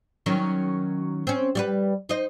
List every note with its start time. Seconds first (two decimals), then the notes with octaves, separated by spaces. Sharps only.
0.26 D#3 F#3 C#4
1.27 C4 C#4
1.55 G3 F#4 B4
2.09 D#4 C5 D#5